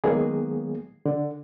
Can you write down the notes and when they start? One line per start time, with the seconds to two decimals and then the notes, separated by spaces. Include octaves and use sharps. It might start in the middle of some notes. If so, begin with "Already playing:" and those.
0.04 D#3 F#3 G#3 A#3 B3 G#4
1.06 D3